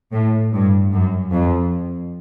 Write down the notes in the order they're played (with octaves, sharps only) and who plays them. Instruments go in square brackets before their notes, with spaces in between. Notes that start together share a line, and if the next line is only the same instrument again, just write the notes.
[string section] A2
G2
F#2
F2